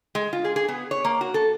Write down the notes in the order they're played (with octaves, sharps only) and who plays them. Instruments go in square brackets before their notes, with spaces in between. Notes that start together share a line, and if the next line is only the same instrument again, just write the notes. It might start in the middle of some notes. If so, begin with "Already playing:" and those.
[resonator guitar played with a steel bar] G#3
F4
G#4
G#4
B3
C#5
A#3
F#4
A4